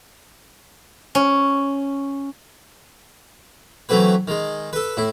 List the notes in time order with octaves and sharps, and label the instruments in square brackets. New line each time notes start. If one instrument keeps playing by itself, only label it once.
[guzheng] C#4
[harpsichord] E3 F#3 A3 C4 B4
D#3 G#3
A4 B4
A2 E4